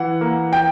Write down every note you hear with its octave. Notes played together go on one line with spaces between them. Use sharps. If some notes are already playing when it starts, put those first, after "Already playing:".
Already playing: E3 F#5
A#3
G5